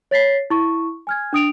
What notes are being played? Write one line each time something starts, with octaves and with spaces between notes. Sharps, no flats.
C#5 A6 B6 C7
E4 C#6
G#5 F6 G#6
D4 D#6 D7 F7